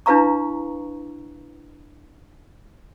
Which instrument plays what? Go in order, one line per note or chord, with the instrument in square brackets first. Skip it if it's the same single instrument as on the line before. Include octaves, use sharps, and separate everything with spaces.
[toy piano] D4 E4 B4 F5 A#5 C#6